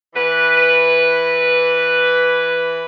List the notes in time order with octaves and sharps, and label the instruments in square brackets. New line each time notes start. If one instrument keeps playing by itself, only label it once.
[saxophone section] E3 B4